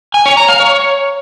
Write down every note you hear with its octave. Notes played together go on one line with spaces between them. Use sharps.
G#5
C#5
A#5
F5
C#5